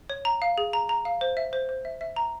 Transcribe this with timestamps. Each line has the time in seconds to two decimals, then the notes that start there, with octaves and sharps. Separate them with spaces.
0.10 C#5
0.25 A#5
0.42 F5
0.58 G#4
0.73 A#5
0.89 A#5
1.05 F5
1.21 C5
1.37 E5
1.53 C5
1.69 C5
1.85 E5
2.01 E5
2.16 A#5